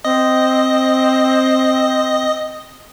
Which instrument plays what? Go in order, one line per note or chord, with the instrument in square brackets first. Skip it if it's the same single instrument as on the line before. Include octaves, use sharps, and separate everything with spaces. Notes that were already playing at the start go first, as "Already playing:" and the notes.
[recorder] C4 [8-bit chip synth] D#5